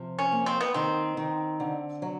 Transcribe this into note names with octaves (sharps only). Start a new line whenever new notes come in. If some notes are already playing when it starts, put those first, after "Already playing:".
Already playing: C3 F3
C#4
A#3
C4
B3
D#3 C4
D#3
D3
F#3